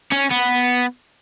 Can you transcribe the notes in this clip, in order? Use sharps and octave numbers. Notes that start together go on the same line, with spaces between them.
C#4
B3